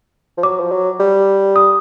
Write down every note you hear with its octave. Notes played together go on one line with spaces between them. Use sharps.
F3
F#3 D6
F3
F#3
G3
D#6